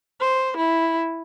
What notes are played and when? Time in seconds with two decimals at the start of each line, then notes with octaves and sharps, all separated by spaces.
0.20 C5
0.57 E4